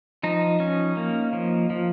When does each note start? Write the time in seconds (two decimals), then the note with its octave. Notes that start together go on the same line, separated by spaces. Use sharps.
0.23 F3 D#4
0.60 C#4
0.97 A#3
1.33 F3
1.70 F3